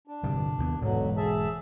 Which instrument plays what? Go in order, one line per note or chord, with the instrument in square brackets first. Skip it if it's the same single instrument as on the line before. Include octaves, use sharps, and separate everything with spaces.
[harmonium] D4
[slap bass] G1 C3 G3
D#2 G#3 B3
[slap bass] E1 G#2 [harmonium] B2 D3 F#3
[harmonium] G#4 E5 A5